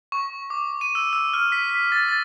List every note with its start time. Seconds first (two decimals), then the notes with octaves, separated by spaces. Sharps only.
0.12 C#6
0.50 D6
0.81 D#7
0.95 E6
1.13 E6
1.33 F6
1.52 B6
1.70 B6
1.92 A6
2.09 A6